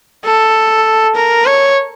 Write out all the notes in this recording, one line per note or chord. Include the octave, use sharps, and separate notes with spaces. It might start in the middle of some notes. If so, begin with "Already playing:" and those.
A4
A#4
C#5